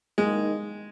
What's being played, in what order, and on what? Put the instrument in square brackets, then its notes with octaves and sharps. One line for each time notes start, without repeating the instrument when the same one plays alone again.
[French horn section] D#3 A#3 D#4 [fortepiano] G#3